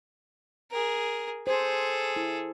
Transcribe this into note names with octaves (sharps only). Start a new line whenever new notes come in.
G#4 A#4
G#4 A4 C5
E4